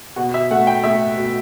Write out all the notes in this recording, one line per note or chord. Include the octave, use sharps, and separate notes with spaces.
B2 F#4
E5
A3 F#5
G5
A3 E5
B2